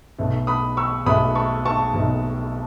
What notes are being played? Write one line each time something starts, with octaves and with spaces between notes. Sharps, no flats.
B1 B2 A3
B5 D#6
C#6 E6
B1 B2 A3 B5 D#6
A5 C#6
A5 C#6
B1 B2 A3